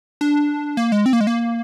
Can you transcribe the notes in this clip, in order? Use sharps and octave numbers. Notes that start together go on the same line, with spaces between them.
D4
A#3
G#3
C4
A#3
G#3
A#3